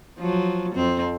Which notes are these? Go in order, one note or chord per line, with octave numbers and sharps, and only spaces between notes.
F3 F#3
F2 C4